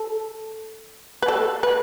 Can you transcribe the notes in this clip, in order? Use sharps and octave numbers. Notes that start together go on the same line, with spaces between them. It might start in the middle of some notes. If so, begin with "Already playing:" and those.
Already playing: A4
B4
A4
B4